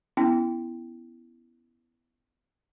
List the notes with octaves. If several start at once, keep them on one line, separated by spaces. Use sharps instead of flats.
B3 C#4 E4 G5